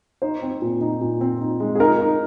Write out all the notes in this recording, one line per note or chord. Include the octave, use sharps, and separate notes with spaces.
D#4 C5
C4
A#2
D#4
A#2
C4
D#4
G#3
G#4
D#4 A#4
D#4